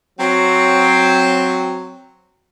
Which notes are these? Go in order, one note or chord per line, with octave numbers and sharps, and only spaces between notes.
F#3 C4